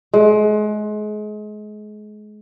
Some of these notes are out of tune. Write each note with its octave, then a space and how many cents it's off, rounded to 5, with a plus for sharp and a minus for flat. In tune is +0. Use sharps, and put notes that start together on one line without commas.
G#3 +30